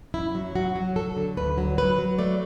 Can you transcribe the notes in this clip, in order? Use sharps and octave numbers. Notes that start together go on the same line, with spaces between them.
F#2 E4
F#3
F#3 F#4
F#3
F#3 A4
D3
D2 B4
F#3
F#3 B4
F#3
A3 D5